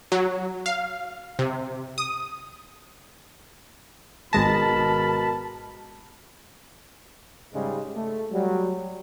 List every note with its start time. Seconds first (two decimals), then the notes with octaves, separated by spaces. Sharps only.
0.12 F#3
0.66 F5
1.39 C3
1.98 D#6
4.33 G#1 B2 G#3 A#4 A5 B5 A#6
7.54 G#2 C#3 G3 G#3
7.96 A3
8.32 F#3 G3